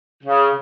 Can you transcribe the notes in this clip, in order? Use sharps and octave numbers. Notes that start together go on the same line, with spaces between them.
C#3